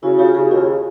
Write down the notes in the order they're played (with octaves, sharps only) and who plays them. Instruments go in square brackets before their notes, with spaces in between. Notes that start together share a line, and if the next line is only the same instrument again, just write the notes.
[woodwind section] C#3 [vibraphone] E4 F#4
[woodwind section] C#3 [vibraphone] F4 G4
[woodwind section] C#3 [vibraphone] F#4 G#4
[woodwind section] D#2 [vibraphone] F4 G4